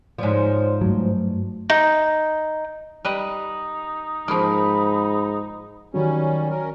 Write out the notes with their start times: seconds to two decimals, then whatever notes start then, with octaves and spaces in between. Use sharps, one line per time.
0.18 G#2 F3 C#5 D5
0.81 G2 F#3 A3
1.70 D#4
3.05 G3 D#4 B4 D#5
4.28 G#2 F3 A#3 B5
5.94 D#3 F#3 G3 C#4
6.50 C#4 A#4